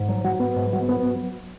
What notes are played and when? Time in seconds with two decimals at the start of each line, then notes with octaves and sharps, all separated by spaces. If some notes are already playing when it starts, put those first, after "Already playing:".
Already playing: G#2
0.09 F#3
0.24 F#3
0.40 B3
0.56 G#2
0.73 F#3
0.89 B3